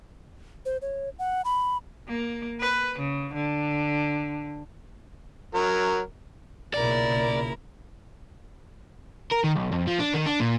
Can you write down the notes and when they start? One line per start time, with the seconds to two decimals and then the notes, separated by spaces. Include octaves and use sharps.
0.66 C5
0.82 C#5
1.19 F#5
1.45 B5
2.08 A#3
2.60 B4
2.99 C#3
3.34 D3
5.55 F#3 A#4
6.74 B1 A#2 C#3 E4 A#4 D5
9.31 A#4
9.44 D#3
9.55 B1
9.72 F2
9.87 F3
9.99 D4
10.14 D#3
10.26 D4
10.40 A#2